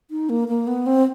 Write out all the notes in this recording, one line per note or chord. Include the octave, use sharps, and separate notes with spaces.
D#4
A#3
A#3
B3
C4